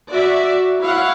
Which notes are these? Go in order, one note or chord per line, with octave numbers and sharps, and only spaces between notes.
F#4 D5 E5
E4 C#5 F5 F#5